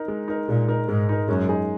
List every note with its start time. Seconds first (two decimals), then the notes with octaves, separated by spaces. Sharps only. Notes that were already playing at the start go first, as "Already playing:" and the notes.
Already playing: D#4 A#4
0.08 G#3
0.28 D#4 A#4
0.48 A#2 G#3
0.68 D#4 A#4
0.88 G#2 G#3
1.09 D#4 A#4
1.28 F#2 G#3
1.49 D#4 G#4